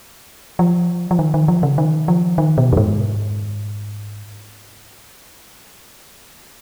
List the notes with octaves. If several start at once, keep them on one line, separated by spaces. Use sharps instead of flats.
F3
F3
D#3
D#3
F3
C#3
D#3
F3
D#3
B2
F#2
G#2